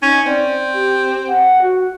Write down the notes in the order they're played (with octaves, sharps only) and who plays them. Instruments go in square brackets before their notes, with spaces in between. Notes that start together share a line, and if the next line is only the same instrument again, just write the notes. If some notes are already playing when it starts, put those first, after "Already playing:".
[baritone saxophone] C#4 [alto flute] D#4
[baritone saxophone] C4 [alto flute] D5
[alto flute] G4
F#5
F#4